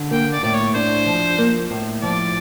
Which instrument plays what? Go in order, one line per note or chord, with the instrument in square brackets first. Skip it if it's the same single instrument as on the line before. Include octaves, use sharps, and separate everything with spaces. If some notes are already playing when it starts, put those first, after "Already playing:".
Already playing: [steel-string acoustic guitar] D3
[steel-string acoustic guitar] A#3 [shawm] G5
[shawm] D5
[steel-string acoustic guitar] A2 [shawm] D5
[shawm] C#5
[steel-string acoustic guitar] D4 [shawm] C5
[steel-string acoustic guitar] F3
A#3
A2
[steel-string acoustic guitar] F3 [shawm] D5